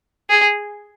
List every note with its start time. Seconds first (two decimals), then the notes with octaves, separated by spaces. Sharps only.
0.30 G#4